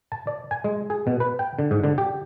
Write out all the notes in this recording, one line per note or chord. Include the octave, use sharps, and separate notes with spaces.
A5
D5
G#5
G#3
G#4
B2
B4
G5
D3
G#2
D3
G4